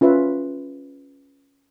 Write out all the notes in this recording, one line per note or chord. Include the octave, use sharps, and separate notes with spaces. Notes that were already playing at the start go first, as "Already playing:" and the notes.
C#4 F4 B4 E5